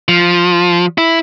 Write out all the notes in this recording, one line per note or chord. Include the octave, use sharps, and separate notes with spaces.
F3
E4